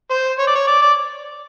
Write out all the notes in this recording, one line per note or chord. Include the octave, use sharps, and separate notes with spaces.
C5
C#5
D5
C#5
D5
D5